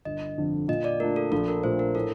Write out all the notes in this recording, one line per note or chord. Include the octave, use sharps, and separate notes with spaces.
G1 D#5
F2 D3
A#2 D#5
D5
A3 D4 F4 A#4
A4
A#1 A4
A#4
A#2 A3 C5
A#4
A2 A4